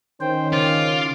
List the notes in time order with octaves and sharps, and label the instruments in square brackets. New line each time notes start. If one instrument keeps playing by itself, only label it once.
[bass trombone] D#3 [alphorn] C#4 [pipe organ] C5 G5
[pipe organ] C#3 D6 [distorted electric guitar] F4